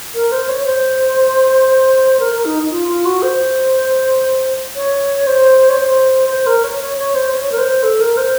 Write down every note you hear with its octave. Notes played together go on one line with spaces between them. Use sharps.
A#4
C5
C#5
C5
A#4
A#4
D#4
F4
F4
F#4
C5
C#5
C5
C#5
C5
C5
A#4
C#5
C#5
C#5
C5
C#5
A#4
C5
A4
A#4
C5